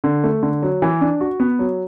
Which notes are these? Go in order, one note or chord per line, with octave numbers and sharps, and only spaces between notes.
D3
A3
D3
F#3
E3
D4
F#4
B3
F#3